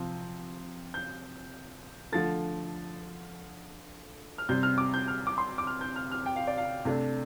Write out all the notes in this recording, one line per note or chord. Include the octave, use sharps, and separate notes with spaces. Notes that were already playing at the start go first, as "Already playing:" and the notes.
Already playing: C3 F3 C4
G6
D3 F3 A3 A6
F6
C3 G3 C4 G6
F6
D6
G6
F6
D6
C6
D6
F6
G6
F6
F6
G5
F5
D5
F5
C3 A3 D4